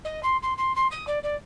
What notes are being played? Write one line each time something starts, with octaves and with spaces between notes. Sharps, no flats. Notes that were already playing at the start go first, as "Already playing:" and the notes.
D#5
C6
C6
C6
C6
D#6
D5
D5